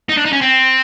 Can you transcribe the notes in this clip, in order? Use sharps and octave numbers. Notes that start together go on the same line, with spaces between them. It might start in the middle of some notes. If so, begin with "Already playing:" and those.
D#4
D4
D#4
C#4
C4